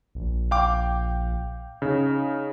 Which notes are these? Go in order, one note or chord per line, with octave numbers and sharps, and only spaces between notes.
A#1
F5 G5 D6
C#3 D#4
D#4